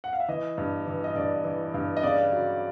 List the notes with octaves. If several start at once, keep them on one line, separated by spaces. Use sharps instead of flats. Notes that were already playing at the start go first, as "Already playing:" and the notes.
F#5
F5
E5
E3 D#5
G2
E3
D#5
G2 D5
E3
G2
D#5
C#3 D5
F#3